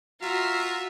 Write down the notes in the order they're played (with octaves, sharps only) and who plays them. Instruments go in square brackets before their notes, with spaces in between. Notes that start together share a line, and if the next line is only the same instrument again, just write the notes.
[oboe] F4 [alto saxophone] F#4 [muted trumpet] E5 [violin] A#5 C7